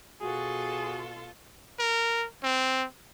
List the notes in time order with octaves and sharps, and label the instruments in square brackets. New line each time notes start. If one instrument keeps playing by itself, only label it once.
[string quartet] B2 F4 A4 [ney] F#4 [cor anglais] G#4
[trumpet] A#4
C4